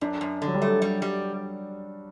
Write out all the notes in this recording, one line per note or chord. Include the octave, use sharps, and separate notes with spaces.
F#2 D4
F#2
D3
F#3
G3
A3
F#3 G3
G3